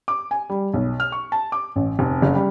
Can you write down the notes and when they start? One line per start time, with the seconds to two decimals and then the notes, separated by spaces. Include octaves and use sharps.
0.08 D6
0.31 G#5
0.49 G3
0.74 B1
1.00 F6
1.12 C#6
1.32 A5
1.52 D6
1.76 A1
1.99 F1
2.22 F#1
2.35 G3